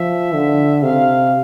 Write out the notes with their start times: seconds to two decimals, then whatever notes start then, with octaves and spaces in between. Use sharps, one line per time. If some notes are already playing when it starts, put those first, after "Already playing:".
Already playing: F3 E5
0.34 D3
0.83 C3 F5